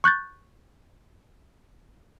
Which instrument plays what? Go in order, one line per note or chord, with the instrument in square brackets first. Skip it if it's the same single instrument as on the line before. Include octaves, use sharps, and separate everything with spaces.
[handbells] C#6 F#6 G6 A6